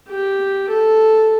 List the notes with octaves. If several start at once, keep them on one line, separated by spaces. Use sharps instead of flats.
G4
A4